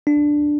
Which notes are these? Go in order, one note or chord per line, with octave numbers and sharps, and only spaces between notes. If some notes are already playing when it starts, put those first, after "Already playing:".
D4